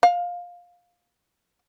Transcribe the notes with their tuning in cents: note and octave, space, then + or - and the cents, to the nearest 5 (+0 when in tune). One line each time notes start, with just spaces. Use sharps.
F5 +15